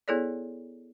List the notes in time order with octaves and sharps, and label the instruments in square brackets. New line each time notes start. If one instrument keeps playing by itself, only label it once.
[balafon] B3 E4 G#4 A4 C#5 D5